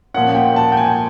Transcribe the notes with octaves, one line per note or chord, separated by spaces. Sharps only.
A#2 F3 A#3 C#4 F#5
G5
A5
G5
G#5